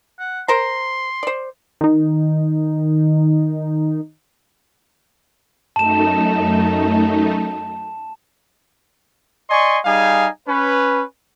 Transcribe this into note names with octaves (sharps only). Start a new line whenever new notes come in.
F#5
A#4 C5 A#5 C6
C5 D5
D#3 D#4
F#2 A3 D#4 A5 E7
D5 D#5 G#5 C6 C#6
G3 D#4 G#4 F5 G#5
C#4 B4